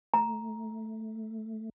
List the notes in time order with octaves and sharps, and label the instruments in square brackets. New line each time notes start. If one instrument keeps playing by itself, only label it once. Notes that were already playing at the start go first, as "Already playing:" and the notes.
[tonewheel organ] A3 [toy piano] A#5